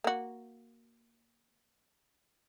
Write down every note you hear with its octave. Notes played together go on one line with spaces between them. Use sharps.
A#3 F#4